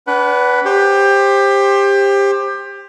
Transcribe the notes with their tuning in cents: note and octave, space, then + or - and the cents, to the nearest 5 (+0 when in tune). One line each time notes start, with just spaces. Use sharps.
D4 -35 B4 +0 F#5 +30
G4 +20 C5 +20